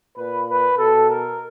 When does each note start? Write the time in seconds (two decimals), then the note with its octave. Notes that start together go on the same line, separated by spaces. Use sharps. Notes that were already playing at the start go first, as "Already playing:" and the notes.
0.17 A#2 B4
0.48 B4
0.78 B2 A4
1.10 A#4